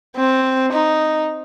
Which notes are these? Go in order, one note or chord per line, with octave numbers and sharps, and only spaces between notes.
C4
D#4